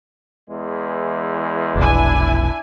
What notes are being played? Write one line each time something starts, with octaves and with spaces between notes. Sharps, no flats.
E2 E3 G#3
F1 B1 D4 E4 G#5